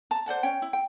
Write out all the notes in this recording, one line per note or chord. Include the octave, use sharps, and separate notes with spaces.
A5 A#5
C5 D5 F#5 A5
C#4 C#5 G5
E4
G5